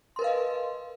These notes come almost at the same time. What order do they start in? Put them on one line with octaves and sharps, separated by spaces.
C6 A#4 B4 F5 D#5